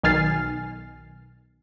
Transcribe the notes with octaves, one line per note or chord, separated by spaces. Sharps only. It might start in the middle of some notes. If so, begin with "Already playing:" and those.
B1 D#3 G#5 F6 A6 C7